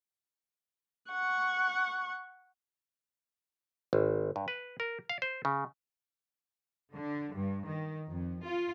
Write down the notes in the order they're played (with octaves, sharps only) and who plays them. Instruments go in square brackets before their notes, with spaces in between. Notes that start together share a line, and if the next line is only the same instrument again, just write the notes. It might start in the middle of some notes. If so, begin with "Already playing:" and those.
[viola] F#5 C#6
[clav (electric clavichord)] G#1
G2
B4
A#4
F5
C5
C#3
[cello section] D3
G2
D#3
F2
F4